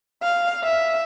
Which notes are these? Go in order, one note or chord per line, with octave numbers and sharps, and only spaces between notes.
F5
E5